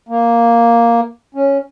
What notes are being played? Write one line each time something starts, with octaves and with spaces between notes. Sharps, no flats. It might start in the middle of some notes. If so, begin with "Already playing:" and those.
A#3
C#4